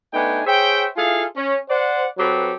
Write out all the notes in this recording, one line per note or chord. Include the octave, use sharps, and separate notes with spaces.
A3 B3 D4 D#4 G5 G#5
G#4 C5 C#5 E5 G5
E4 F4 G#4 A4 F5 G#5
C#4
C5 D5 F#5
F#3 C4 G4 A4 B4